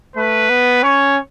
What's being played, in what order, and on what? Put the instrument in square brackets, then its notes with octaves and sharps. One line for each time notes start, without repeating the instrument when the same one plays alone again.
[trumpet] A3 [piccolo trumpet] B4
[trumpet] B3
[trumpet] C#4 [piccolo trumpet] C#5